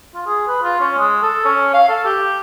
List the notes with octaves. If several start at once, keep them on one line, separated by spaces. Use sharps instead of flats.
F4
G#4
B4
F4
C#4
G#3
A4
C#4
F5
A4
G4